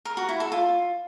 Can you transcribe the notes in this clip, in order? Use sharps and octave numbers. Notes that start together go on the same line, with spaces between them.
A#4
F#4
E4
A4
F4